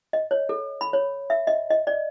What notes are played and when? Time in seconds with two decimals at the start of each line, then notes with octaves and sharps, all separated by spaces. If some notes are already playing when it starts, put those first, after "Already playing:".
0.13 D#5
0.31 C#5
0.49 A4
0.81 B5
0.93 C#5
1.30 E5
1.47 D#5
1.71 D#5
1.87 D5